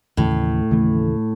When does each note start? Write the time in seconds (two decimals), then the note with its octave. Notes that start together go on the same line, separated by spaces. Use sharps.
0.17 D#2 A2 C#3 E3 A3
0.71 D#2 C#3 E3 A3